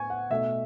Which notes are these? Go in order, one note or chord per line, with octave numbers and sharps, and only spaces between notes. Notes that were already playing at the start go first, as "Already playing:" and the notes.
Already playing: A2 B3 G#5 C#6
F#5
B2 A3 D#4 E5